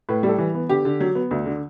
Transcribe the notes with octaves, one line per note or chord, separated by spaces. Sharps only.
A2 B4
G3
A4
E3
B3
D3 G4
D3
F#3
B3
D2
D3